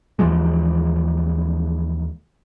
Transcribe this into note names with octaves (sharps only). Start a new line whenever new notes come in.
D#2 E3 F3 G#3